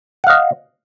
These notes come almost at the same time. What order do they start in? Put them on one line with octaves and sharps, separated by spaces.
F#5 F5 D#5